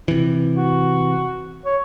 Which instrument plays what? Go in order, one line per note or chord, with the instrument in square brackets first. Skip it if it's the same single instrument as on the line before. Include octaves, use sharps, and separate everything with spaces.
[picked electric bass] C3 E3
[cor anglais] F#4
C#5